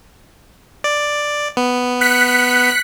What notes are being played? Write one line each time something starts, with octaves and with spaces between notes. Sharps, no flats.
D5
B3
F#6 B6 C#7